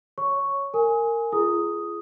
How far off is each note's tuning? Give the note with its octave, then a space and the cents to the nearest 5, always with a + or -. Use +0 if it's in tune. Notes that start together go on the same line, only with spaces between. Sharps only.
C#5 +0 C#6 +0
A#4 -20 G#5 +0 D#6 +30
F4 -40 G#4 +15 D#6 +0